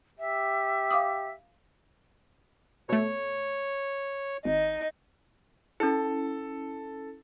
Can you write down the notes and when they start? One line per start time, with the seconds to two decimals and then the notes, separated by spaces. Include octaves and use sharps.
0.19 G4 E5
0.91 F5 D6 D#6
2.89 B2 A3 C#5
4.45 G#1 D#4
5.80 C#4 E4 A4